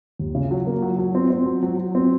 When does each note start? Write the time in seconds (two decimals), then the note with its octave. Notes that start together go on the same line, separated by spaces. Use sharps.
0.19 D#2
0.35 C#3
0.51 F#3
0.67 A#3
0.82 F#3
0.99 F#3
1.15 C4
1.30 C4
1.46 F#3
1.63 F#3
1.78 F#3
1.95 C4